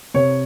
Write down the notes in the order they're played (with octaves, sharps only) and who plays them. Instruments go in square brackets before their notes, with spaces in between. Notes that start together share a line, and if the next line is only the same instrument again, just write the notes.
[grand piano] C3 C#5